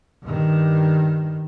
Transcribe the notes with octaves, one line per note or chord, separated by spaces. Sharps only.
G2 D#3